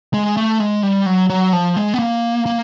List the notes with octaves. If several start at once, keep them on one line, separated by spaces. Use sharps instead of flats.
G#3
A3
G#3
G3
F#3
F#3
F3
G#3
B3
A#3
A#3